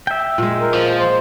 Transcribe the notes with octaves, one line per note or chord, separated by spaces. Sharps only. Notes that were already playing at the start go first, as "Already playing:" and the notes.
E5 G5
A#2 G#3
A#4
F3
C5